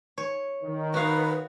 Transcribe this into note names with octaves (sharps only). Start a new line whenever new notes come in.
C#5
D#3
F#4 B4 F5